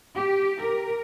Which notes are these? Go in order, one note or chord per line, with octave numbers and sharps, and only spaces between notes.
G4
A#4